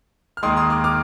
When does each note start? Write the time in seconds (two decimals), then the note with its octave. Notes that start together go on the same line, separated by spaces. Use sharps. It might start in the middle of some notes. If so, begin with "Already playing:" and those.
0.37 F6
0.43 D#2 D#3 G#3 C6 D#6
0.57 C6 D#6
0.70 D6 F6
0.84 D6 F6